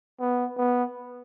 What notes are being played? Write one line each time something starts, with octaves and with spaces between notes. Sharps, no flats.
B3
B3